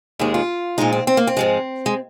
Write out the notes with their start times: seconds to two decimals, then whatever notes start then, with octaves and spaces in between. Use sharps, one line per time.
0.19 D#2 D#3 G#3 G#4
0.34 F4
0.78 A#2 F3 G#3 D#4
0.93 C4
1.07 C4
1.17 A#3
1.27 C4
1.37 G#2 F3 G#3
1.86 G#3